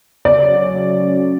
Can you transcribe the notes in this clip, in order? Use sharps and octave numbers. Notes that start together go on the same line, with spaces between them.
C#3 D5
F#3
C#4
A3
C#3
F#3
C#4